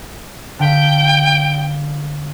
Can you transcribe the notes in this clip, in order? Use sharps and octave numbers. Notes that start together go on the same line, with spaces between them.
D3 F5 G5 B6